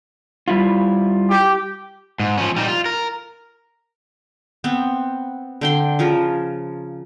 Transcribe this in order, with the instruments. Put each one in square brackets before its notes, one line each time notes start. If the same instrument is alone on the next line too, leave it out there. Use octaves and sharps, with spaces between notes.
[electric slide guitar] G3 E4 F4
[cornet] G4
[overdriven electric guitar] G#2
F3 C#4
G3 D#4
F4
A#4
[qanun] B3 C4
D3 G5 C6
C#3 F3 A#4